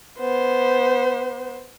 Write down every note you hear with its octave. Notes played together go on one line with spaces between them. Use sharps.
B3 C5